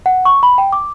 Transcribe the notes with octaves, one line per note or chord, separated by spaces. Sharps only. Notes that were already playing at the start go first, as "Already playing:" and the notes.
F#5
C#6
B5
G5
D6